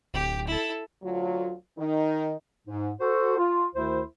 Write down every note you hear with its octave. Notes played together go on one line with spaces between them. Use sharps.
D1 G4
E4 A4
D2 F#3 F4
D#3 D#4
G#2
F#4 A4 C5
F4
D2 D#3 E4 C5